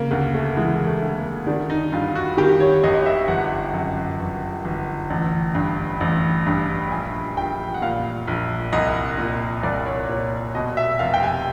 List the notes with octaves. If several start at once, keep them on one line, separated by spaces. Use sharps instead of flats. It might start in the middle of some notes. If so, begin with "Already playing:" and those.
Already playing: C#3 A#3
D2 A#3
A3
E3 G#3
A3
D2
A#3
D#3 D4
D#4
G2 F4
F#4
D#3 G4
C#5
G#1 D#5
E5
G1 F#5
F#2
G1
G1
A1
G2
A1
G2
A#1 G#5
A#1 G5
F#5
A#2 F5
A#1
C2 D#5
A#2
C2 D5
C#5
A#2 C#5
B2 D#5
E5
F1 F5
G5
G#5